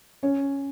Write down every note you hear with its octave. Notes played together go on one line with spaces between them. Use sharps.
C#4 C#5